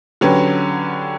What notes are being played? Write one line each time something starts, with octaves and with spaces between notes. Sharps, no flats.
D3 F#3 C#4 G4 B4